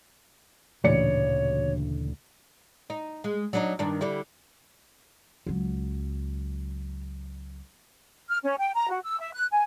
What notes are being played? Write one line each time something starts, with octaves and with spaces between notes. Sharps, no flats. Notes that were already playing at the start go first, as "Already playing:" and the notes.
A1 D2 A#2 C#3 E3 C#5 D5 C#7
D#4
G#3
F#3 D4 D#4
G2 D#3 D4
D3 G3 E4
C#2 F#3
F6
C#4
G5
A#5
F#4
E6
E5
F#6
G#5